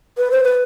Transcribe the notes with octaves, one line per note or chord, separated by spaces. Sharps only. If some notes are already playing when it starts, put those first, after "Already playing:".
B4
C5
B4